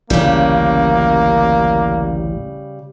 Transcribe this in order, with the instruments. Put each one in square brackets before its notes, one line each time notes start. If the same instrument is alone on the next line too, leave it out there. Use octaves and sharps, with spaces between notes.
[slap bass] A1 D2 [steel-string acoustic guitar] C#3 G3 [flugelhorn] A#3